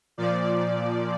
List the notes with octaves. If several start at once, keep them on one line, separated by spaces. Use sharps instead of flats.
A#2 F3 D5